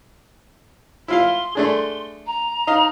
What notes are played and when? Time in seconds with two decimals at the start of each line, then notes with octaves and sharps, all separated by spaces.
1.08 E4 F4 F5 C6
1.55 A3 D4 G#4
2.27 A#5
2.67 D#4 D#5 F5